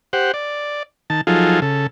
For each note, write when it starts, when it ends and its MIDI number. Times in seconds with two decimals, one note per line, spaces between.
0.13 0.32 67
0.13 0.32 72
0.13 0.32 78
0.34 0.83 74
1.10 1.21 51
1.10 1.21 81
1.27 1.60 53
1.27 1.60 54
1.27 1.60 63
1.27 1.60 65
1.27 1.60 68
1.27 1.60 69
1.62 1.87 49
1.62 1.87 69